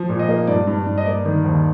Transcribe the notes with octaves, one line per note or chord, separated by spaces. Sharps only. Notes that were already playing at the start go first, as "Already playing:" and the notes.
Already playing: F3
A#2
D#5
A#3
G2 D5
G2
G2
D#5
A#3 D5
D#3
D#2